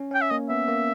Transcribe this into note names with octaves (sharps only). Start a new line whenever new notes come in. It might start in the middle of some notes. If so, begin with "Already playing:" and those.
Already playing: C#4
C#4 G5
E5
A#3 D#5
B3 E5
A#3